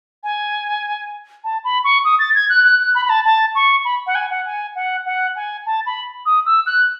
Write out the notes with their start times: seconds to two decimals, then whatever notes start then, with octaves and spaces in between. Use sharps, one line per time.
0.24 G#5
1.44 A5
1.64 B5
1.84 C#6
2.04 D#6
2.19 A6
2.35 G#6
2.49 F#6
2.65 F#6
2.80 F#6
2.95 B5
3.05 B5
3.10 A5
3.25 A5
3.55 C#6
3.85 B5
4.07 F#5
4.15 G#5
4.31 F#5
4.46 G#5
4.75 F#5
5.06 F#5
5.36 G#5
5.66 A5
5.86 B5
6.26 D#6
6.46 E6
6.66 F#6